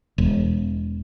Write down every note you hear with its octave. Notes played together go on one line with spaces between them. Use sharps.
E1